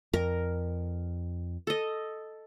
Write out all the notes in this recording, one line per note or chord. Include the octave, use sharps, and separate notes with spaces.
F2 A#4
A4 D#5